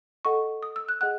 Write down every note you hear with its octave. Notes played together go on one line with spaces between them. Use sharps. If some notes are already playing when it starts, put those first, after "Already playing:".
A4 D#5 F#5 C#6
D#6
E6
F#6
G#4 D#5 F#5 F#6